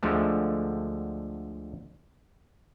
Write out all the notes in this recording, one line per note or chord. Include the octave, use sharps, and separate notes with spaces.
D2 D3 F3 G#3 A3